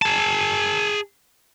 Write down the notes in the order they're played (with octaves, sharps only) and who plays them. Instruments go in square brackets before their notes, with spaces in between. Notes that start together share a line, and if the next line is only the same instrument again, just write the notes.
[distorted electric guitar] G#4 A5